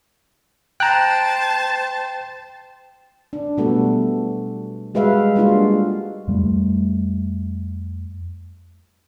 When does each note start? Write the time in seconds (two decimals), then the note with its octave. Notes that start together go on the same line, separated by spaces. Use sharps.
0.80 C5 G5 A5 A#5 F#6
3.33 D4
3.57 B2 G3 A3 B3 F#4 A4
4.94 G3 G#3 F#4 B4 E5 F5
5.35 G3 G#3 A#3 D4 F4 F#4
6.27 F2 G3 A3